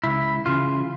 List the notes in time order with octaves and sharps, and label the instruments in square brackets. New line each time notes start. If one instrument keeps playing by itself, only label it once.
[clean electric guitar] C#2 E4
C#3 E3 F4